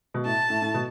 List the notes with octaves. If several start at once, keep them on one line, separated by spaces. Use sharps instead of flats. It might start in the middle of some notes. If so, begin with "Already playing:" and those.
B2
A2 A5
A2
A2
B2